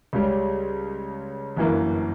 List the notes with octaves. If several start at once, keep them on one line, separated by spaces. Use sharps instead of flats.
C#2 C#3 G3 C#4
G1 F#2 E3 A#3